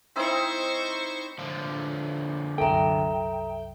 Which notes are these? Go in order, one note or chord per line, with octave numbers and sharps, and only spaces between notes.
C4 D#4 E4 C5 C#6
D3 F3
C2 F#2 A4 E5 G5 A#5